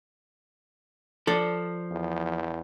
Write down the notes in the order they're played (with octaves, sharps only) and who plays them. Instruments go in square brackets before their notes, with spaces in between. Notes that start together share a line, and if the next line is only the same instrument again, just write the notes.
[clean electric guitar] F3 [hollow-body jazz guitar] A4 D5
[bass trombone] E2